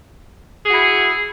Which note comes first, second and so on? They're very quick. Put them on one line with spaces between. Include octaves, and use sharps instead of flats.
G#4 F#4 E4